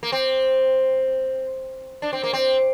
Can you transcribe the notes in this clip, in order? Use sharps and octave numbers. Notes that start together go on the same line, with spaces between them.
A#3
C4
D4
C4
A#3
C4